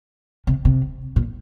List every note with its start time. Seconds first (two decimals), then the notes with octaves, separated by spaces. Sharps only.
0.47 C3
0.65 C3
1.16 A#2